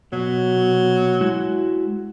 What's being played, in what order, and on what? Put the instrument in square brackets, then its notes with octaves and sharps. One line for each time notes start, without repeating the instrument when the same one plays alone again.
[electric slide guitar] B2 [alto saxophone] F#3
[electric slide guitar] G#3 E4 F#4